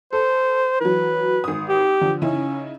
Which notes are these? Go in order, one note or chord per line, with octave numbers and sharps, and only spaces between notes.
A4 C5
E3 F#3 B4
G#1 D#6
G4
D3 F3
C#3 C#4 D#4 E4